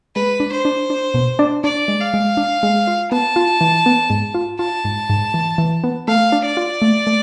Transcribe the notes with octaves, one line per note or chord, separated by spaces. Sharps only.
G#3 B4
D4
C5
D4
D4
B2
D4
D4 D5
G#3
F5
G#3
D4
G#3
F4
B3 A5
F4
E3
B3
G#2
F4
F4 A5
G#2
G#2
E3
E3
B3
A3 F5
D4
D5
F4
A3
A3